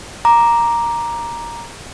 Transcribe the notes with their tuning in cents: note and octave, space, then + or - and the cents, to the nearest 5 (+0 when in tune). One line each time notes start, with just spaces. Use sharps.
A#5 +5 D6 +5